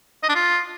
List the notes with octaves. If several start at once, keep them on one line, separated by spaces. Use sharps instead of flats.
D#5
D4
F4